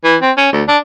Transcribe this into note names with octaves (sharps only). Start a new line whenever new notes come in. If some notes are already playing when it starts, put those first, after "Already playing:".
E3
C4
C#4
D2
D4